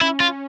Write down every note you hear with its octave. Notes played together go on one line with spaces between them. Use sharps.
C#4 E4
C#4 F4